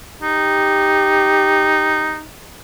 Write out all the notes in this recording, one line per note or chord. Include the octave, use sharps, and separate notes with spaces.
D#4 G4